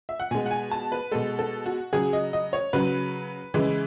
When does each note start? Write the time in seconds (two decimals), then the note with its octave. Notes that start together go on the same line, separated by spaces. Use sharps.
0.09 E5
0.20 F#5
0.31 B2 G#3 G#5
0.46 F#5
0.51 G#5
0.71 A5
0.92 B4
1.11 B2 G#3 A4
1.39 A4
1.66 F#4
1.93 C#3 F#3 G#4
2.13 D#5
2.33 D#5
2.53 C#5
2.73 C#3 F#3 B4
3.54 C#3 E3 G#3